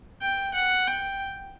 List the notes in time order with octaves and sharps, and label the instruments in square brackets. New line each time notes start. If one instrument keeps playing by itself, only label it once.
[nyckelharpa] G5
F#5
G5